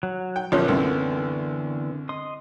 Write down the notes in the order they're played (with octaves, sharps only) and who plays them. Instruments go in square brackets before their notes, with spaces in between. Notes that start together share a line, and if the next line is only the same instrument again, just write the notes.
[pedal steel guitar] F#3
[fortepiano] G5
[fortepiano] A#1 F3 C#4 [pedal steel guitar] D3 E3 B3
[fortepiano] C2 F#2
[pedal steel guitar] D#5 C6 D#6